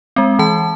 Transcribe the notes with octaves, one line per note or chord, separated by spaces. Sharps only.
G#3 C4
E3 A5